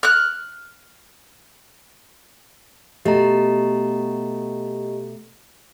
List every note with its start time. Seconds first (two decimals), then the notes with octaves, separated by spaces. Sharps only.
0.03 F6 F#6
3.05 B2 A3 G4 D#5 A#5